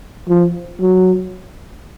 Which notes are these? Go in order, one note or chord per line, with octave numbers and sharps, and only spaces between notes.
F3
F#3